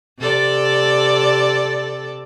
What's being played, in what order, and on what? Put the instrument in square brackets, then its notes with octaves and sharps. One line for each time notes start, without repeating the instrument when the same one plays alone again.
[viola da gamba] C3 A4 D5